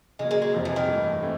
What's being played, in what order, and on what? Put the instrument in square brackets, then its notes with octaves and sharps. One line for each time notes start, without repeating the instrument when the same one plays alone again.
[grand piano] C#3 F#3 A#3 [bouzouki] G#3
[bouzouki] G#3
G#3
[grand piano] F2 C3 F3
[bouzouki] E3
D#3
[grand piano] G2 E3 A3
E3 A3 C4